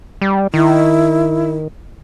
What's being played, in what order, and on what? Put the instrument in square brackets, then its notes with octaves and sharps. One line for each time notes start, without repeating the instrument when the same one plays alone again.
[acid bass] G3
[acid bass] D#3 [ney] E4